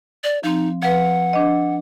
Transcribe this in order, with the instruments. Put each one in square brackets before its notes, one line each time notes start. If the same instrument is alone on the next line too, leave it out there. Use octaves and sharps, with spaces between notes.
[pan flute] D5
[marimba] F3 C4 [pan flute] D#4
[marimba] F3 B4 [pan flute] F#5
[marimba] D4 D#5